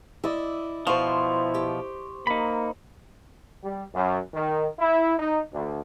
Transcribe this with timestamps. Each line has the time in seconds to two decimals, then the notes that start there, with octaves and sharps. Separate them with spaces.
0.24 E4 D5 D#5 E6
0.87 B2 F3 E4 C5 F5 C#6
1.54 G4
2.27 A#3 D#4 B5
3.64 G3
3.95 F#2
4.34 D#3
4.79 E4
5.19 D#4
5.54 D2